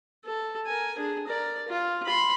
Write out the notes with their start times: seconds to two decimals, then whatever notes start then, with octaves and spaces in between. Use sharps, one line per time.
0.25 A4
0.66 A#4 G#5
0.98 D4 G#4
1.27 A#4 D5
1.68 F4
2.06 B5 C6